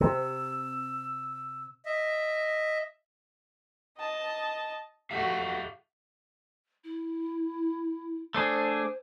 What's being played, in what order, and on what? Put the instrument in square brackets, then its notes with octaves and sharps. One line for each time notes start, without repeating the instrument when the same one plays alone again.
[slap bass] C3 [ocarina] E6
[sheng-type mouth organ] D#5 E5
[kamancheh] D#5 A5
[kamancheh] A3 F#4 [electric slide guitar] G4 E5 F5
[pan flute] E4
[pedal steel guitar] A3 D4 G#4 [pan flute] C5